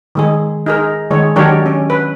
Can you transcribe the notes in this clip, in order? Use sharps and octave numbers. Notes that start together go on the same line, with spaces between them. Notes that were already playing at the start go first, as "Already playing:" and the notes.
D#3 G#3 G#4
D#4 G#4 A#4
D#3 G#3 C#5
D#3 F#3 D4 G4 A#4 C#5
C#4
B4